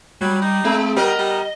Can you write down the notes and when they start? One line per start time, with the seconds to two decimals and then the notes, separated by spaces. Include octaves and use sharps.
0.21 F#3 G3
0.42 D#4
0.65 G#3 C4
0.97 G3 B3 A#4 D#5
1.19 G3